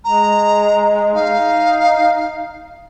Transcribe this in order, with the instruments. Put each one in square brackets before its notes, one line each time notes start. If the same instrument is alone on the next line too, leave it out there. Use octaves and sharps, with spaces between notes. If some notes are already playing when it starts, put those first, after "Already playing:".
[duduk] G#3 [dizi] A#5
[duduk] D#4 [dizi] F5